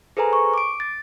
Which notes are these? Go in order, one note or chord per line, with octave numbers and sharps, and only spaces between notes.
G#4 A4 B4 C5 G#5 A#5
C#6
D6 D7
A6